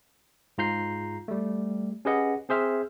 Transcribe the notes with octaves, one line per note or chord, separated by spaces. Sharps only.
G#2 F4 A#5 G6 C7
G3 A3
C#4 G4 G#4 B4 D#5 F#5
C4 G#4 C5 E5 F6